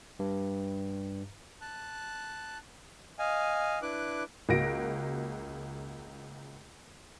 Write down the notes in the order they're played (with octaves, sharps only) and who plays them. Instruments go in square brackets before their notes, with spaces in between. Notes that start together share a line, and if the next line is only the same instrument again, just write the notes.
[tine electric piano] G2
[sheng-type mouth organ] A5 F#6
D#5 F5 G#5
D4 E4 B4 D6 F#6
[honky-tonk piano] C#2 A#3 F#4 A#6 D7